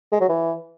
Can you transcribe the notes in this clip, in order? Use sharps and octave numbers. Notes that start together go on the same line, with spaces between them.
G#3
F#3
E3